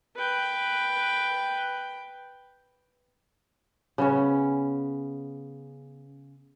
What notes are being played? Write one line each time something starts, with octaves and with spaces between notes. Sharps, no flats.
B4 G5
C#3 B3 C#4